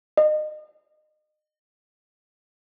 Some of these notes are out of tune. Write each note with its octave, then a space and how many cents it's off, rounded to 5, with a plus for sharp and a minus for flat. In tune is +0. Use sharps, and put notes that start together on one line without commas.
D#5 -30